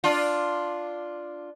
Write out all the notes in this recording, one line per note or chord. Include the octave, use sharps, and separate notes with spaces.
D4 F4